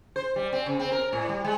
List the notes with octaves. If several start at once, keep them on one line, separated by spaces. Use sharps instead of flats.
C5
G3
C4
C#3
C4
A#4
A2
G3
G#3